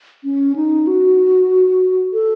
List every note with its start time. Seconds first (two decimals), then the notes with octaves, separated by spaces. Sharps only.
0.24 C#4
0.56 D#4
0.87 F#4
2.13 A4